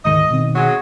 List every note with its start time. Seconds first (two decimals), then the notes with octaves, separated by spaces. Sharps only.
0.05 D2 G#2 D#3 D#5
0.30 B2 D#3 C4
0.56 F#3 G#3